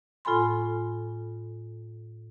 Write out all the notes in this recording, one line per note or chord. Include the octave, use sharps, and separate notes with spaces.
A2 F4 A4 G#5 B5 C6